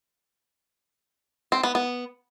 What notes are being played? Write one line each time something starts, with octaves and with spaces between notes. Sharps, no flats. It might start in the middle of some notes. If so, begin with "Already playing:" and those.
C4
B3
B3